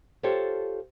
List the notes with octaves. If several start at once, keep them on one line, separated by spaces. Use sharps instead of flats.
F4 G4 A4 C5 C#5